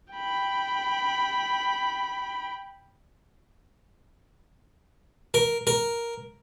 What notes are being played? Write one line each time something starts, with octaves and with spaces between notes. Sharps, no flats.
G5 B5
A#4
A#4